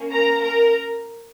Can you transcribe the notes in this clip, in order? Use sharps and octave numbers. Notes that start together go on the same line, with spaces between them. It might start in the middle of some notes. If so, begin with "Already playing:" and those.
Already playing: A#3 C#4
A#4 A#5
A#4 A#5